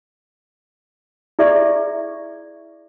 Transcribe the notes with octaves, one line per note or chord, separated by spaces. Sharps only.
E4 G#4 D5 E5 C#6